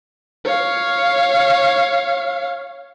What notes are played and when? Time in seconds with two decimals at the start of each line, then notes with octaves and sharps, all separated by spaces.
0.45 C#5 F5